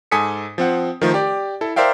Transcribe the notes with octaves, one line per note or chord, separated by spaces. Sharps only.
G#2 A4 G#5 D#6 B6 C#7
F3 C4 F#5
D#3 F3 A3
G4 D5
E4 A4
A#4 C5 D5 E5 F5 G5